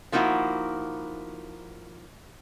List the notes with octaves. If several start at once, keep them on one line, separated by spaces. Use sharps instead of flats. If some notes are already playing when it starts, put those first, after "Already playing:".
F3 A#3 D#4 E4 F#4